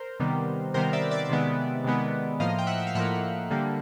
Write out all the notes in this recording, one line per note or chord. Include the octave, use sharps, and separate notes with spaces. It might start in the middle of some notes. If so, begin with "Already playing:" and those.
Already playing: A#4 C5
C3 D#3 G3 B3
C3 D#3 G3 B3 A#4 C5
D5 E5
D5 E5
C3 D#3 G#3 B3
C3 D#3 G#3 B3
A2 F3 A#3 D#5 F5
G5
E5 F#5
E5
F5
A2 F3 A#3 E5 F#5
D3 G3 A#3